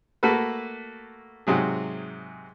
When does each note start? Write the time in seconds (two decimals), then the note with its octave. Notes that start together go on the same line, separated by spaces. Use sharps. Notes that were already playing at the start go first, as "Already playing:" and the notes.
0.23 A3 A#3 F#4 A4 B4
1.47 G#2 C3 F#3 G#4